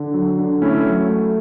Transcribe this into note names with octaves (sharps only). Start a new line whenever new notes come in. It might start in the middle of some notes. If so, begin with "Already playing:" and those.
Already playing: D3
F#3
D3
A3 C#4 E4
F#3
A3